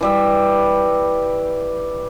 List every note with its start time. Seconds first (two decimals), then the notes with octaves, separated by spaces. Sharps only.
0.01 E3 G3 E5